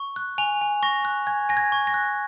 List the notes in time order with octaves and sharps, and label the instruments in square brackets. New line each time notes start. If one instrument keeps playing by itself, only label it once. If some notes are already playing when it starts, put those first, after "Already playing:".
Already playing: [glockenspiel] C#6
F#6
G#5 F7
G#5
C#6 A#6
F#6
G#5 G#6
G#5 A#6
G#6
C#6
A#6
F#6